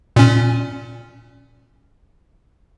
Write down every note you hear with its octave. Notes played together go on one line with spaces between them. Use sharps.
A#2 C#4